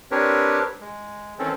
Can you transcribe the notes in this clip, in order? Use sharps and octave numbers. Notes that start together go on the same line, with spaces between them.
C4 D4 G4 A#4 B4 C#5
G#3
D#3 E3 C4 C#4 A4